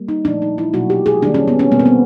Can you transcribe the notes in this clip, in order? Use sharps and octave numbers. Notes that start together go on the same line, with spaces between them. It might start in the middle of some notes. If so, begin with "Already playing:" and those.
Already playing: G3 A#3
D#4
A#2 F3 A3 D4
D#4
E4
B2 F#3 A#3 F#4
G4
G#4
D#3 G3 A#3 D4
C#4
B3
C#4
B2 G3 A#3 B3
C4
B3